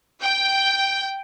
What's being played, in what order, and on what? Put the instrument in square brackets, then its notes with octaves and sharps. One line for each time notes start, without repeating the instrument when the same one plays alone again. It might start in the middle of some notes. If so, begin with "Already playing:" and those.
[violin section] G5